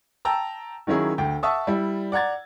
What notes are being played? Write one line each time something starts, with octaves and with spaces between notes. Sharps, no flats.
G5 A5 A#5 E6
D#3 F#3 C#4 E4 G#4
D2 G5
E5 F#5 A5 C#6 D#6 E6
G3 E4
D5 F#5 A#5 G#6 A6